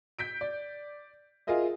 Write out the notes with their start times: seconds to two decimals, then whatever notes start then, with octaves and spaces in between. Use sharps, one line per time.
0.19 G6 B6 D7
0.41 D5
1.47 F4 G#4 A#4 D#5 E5